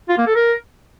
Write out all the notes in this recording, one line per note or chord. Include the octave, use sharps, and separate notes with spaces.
F4
A#3
A4
A#4